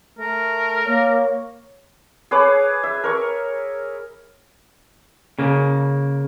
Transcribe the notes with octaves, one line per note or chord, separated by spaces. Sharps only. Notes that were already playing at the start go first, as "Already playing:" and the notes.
A3 A#4
A#3 C#5
G#4 B4 C#5 D6
E5
A#4 C#6
C#3 A#3